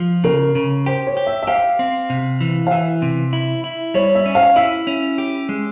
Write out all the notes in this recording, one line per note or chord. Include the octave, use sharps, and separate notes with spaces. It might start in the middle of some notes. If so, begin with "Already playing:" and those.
Already playing: F3
C#3 A#4
C#3
G4 C5
C#5
G4
E5
E5
G4 F5
C4
C3
E3
F5
E3 E5
C3
E4
E4
G3 C#5
E5
C#4
F5
E4 E5
C#4
G4
G#3